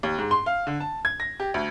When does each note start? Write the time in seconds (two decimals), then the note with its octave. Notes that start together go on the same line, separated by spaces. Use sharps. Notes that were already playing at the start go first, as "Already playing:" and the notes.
0.03 D#2
0.18 G#2
0.31 C6
0.46 F5
0.67 D3
0.80 A5
1.05 G#6
1.20 A#6
1.40 G4
1.54 D2